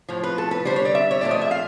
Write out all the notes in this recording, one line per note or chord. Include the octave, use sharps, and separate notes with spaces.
A2 F3
B4
A4
B4
D3 G3 C5
C#5
D5
E5
C#5
A#2 F3 A3 D5
D#5
E5
F5